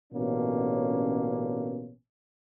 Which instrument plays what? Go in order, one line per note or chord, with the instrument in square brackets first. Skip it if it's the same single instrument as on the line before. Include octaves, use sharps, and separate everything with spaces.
[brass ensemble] A1 B2 D3 A#3 C#4